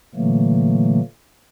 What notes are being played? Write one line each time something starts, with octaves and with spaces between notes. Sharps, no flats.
A#2 D3 E3 F#3 A3 A#3